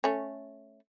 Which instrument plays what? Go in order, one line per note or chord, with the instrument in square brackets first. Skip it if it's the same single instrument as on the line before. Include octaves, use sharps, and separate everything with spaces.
[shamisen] A3 C#4